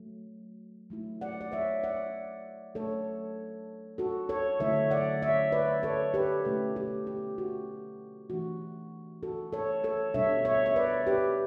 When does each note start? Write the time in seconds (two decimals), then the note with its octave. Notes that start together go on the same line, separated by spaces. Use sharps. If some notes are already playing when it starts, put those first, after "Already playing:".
Already playing: F#3 A3
0.90 F#3 A3 E4
1.21 D5 F#5
1.41 D5
1.52 C#5 E5
1.83 D5 F#5
2.75 F#3 A3 D4 A4 C#5
3.98 F#4 A4
4.29 A4 C#5
4.60 D3 F#3 A3 E4 C#5 E5
4.91 D5 F#5
5.22 C#5 E5
5.52 B4 D5
5.83 A4 C#5
6.14 G4 B4
6.45 B2 A3 C#4 E4 G4
6.76 G4
7.07 G4
7.38 F#4
8.30 E3 A3 D4 F#4
9.23 F#4 A4
9.52 A4 C#5
9.84 A4 C#5
10.14 B2 G3 D4 C#5 E5
10.45 C#5 E5
10.66 E5
10.76 B4 D5
11.07 G4 B4